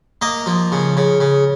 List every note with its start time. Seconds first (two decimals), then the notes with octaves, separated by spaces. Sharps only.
0.22 A#3 D#5
0.46 F3
0.72 C#3
0.97 C#3
1.20 C#3